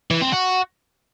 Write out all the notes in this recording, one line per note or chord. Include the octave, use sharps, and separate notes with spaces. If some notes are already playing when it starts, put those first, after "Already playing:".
E3
C4
F#4